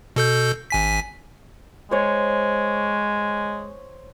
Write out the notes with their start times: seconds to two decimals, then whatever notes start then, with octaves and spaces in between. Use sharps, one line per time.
0.16 B2 A4 G6
0.70 G#1 G#5 B6
1.91 G#3 C5 C#5